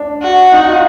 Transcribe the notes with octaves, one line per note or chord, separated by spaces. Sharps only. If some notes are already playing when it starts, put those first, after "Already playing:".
Already playing: D4
F#4
D#4
F4